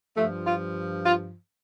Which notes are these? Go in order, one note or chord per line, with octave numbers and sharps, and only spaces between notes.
G2 F3 A3
F4
F4